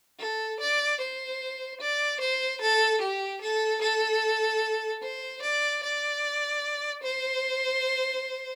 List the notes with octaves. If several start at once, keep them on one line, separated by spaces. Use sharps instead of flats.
A4
D5
C5
D5
C5
A4
G4
A4
A4
C5
D5
D5
C5